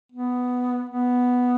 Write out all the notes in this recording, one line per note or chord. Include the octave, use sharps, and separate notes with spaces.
B3
B3